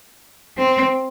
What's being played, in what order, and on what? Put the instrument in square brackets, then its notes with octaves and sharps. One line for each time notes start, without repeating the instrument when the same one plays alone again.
[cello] C4